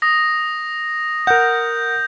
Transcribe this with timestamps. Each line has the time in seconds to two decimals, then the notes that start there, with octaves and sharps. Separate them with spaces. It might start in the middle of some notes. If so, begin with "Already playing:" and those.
0.02 D#6 A#6
1.27 A#4 F#5 G6